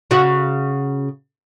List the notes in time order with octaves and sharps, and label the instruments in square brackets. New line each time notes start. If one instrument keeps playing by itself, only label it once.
[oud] C#3 F#4